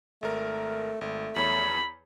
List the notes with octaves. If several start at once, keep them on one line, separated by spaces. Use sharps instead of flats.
G#1 A3 A#4
G#1 A3
E2 C#5 B5